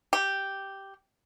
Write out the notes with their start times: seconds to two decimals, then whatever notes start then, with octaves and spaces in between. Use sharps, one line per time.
0.13 G4